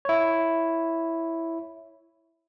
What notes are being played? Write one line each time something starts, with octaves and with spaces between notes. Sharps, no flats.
E4 C#5